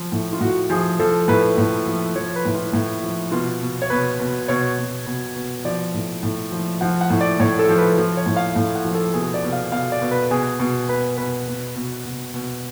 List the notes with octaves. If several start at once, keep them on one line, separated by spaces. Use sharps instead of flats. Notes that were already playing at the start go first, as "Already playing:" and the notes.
Already playing: F3
A2
F4
A2 F#4
F3 G#4
F3 A4
A2 B4
A2
F3
F3 C#5
B4
A2
F4
A2
F3
B2 F4
B2
C#5
B2 B4
B2
B2 C#5
B2
B2
B2
F3 D5
A2
A2
F3
F3 F#5
F#5
A2
D5
A2 C#5
A4
F3
B4
F3
C#5
A2
F5
A2
F#5
F3
A4
B2 G#4
D5
B2
F5
B2 F5
D5
B2
B4
B2 G#4
B2
B2 B4
B2 B4
B2
B2
B2
B2